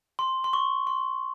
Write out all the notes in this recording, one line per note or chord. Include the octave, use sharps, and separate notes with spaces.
C6
C6
C#6
C6